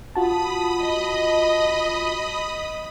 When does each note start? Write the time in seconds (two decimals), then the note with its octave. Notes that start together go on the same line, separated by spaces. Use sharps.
0.15 F4 F#4 A5 B5 D#6
0.82 D#5